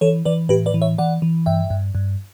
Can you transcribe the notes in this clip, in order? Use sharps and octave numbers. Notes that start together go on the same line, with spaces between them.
E3 A4 C#5
E3 B4 D5
A2 G4 B4
B4 D5
E3
C#5 E5
E3 D5 F#5
E3
G2 E5 G5
G2
G2